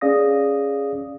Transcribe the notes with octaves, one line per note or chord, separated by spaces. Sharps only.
C#4 G#4 D5 F5 D#6 A#6